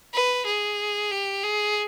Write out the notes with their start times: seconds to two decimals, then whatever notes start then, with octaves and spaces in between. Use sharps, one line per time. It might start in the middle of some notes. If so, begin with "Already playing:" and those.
0.14 B4
0.46 G#4
1.11 G4
1.44 G#4